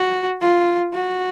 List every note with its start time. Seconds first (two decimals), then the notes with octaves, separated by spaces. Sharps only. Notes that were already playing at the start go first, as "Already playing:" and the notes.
Already playing: F#4
0.41 F4
0.94 F#4